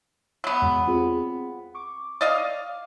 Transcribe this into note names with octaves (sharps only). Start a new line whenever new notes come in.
F#3 B3
E2 G#3 F#5
C4 F4 G#4
C#6 D6
D5 D#5 F5